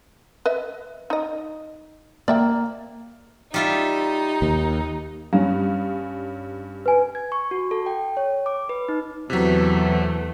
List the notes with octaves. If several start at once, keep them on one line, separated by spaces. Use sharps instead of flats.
B4 D#5 E5
D#4 D#5
A#3 D5 E5 G5
G3 D#4 F4 E5
D#2
G2 C#4 F5
B4 G#5
G#6
C#6
F#4
A4
G5
C#5
D6
B4
D#4
E2 C3 F#3 A3 E4 B4